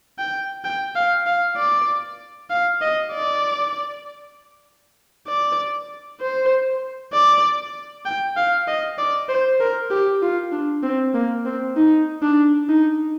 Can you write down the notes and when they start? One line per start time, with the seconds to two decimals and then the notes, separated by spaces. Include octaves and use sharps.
0.18 G5
0.65 G5
0.95 F5
1.26 F5
1.57 D5
2.50 F5
2.81 D#5
3.12 D5
5.28 D5
6.21 C5
7.13 D5
8.06 G5
8.36 F5
8.67 D#5
8.98 D5
9.29 C5
9.60 A#4
9.91 G4
10.22 F4
10.52 D4
10.83 C4
11.14 A#3
11.45 C4
11.76 D#4
12.22 D4
12.69 D#4